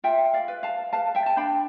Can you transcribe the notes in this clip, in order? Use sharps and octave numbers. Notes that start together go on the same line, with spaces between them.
F4 E5 G5
D5 F5
B4
F5 A5
B4 F5 A5
E5 G5
A5
D4 G5 B5